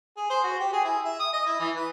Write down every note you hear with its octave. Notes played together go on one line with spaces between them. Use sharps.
G#4
C5
F#4
G4
G#4
E4
E5
D#6
D#5
E4
E3
B4